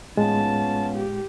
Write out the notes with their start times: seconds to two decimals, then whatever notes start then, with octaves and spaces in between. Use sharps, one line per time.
0.17 A2 G#3 B3 C#4 F4 A5
0.96 G4